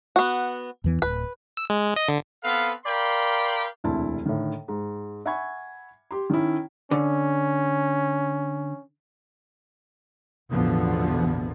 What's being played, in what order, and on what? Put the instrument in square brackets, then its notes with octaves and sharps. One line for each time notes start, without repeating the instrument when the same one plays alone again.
[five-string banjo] B3 F#4
[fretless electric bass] E2 E3 B3
[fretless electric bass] D1 [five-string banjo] B4
[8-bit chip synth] E6
G#3
D#5
D3
[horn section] B3 C4 A4 B4 F5
A#4 D5 F5 G5 B5 C6
[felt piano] E1 D2 C3 E4 A5
A2 D3 D#3
G#2
E5 F#5 G#5 B5 C#6 G#6
G4 C6
D#3 C#4 E4
[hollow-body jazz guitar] D3 [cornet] C#4
[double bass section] A1 E2 B2 D3 F3 B3